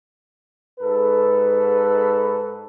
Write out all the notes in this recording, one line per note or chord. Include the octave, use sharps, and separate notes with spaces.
G#2 A4 B4